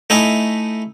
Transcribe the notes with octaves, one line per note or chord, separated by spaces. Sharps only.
A3 D#4 E4 D#5 G#5